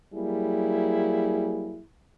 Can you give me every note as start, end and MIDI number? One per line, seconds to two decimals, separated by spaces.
0.13 1.81 54
0.13 1.81 55
0.13 1.81 58
0.13 1.81 64
0.13 1.81 68